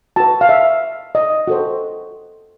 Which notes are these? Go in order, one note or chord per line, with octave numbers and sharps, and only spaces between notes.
F#4 B4 A5
F5
E5
D#5
F#4 A4 C5